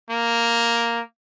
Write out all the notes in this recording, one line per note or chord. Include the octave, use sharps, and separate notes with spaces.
A#3